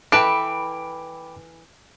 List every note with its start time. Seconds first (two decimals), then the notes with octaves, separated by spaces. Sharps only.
0.12 E3 A4 B4 G5 B5 D6 D7